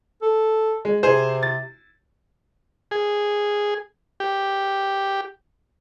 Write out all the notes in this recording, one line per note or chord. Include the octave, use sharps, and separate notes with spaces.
A4
G#3
C3 G#4 C5
A6
G#4
G4